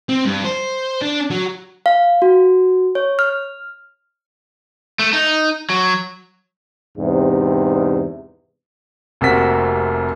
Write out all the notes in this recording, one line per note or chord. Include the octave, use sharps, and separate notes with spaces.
C4
G2
C5
D4
F#3
F5
F#4
C#5
F6
A3
D#4
F#3
E2 G#2 C3
F1 C3 A#3 F#4 B6